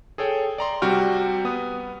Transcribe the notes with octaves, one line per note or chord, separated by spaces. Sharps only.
G#4 A4 C#5 G5
D5 A#5 C6
C3 G3 F#4 G5 F6
B3 D#6